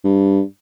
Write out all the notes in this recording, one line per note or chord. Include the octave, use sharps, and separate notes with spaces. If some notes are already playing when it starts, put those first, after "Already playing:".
G2